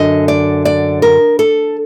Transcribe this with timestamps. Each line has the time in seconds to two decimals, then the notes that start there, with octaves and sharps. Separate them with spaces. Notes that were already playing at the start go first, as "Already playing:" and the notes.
Already playing: F#2 D3 D#5
0.28 D5
0.65 D5
1.02 A#4
1.39 A4